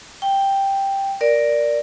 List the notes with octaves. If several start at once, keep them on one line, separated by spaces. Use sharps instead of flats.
G5
A#4 D5